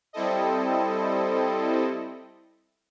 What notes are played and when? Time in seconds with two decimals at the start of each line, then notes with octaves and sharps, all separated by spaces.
0.13 G3 C4 E4 A4 D#5